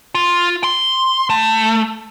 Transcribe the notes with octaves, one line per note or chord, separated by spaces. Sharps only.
F4
C6
A3